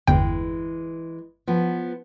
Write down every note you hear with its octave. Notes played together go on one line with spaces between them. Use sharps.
G1 E2 E3 G#3 G5
F3 B3